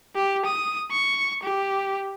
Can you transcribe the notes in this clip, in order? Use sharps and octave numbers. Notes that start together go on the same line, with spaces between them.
G4
D#6
C#6
G4